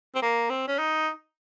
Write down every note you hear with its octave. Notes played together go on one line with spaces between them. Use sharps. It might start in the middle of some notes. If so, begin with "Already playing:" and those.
C4
A#3
C4
C#4
D#4